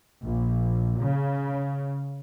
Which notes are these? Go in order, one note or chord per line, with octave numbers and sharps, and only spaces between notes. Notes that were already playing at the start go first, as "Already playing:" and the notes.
A#1
C#3